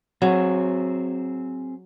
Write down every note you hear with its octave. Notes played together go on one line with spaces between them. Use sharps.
F#3 C4 G#4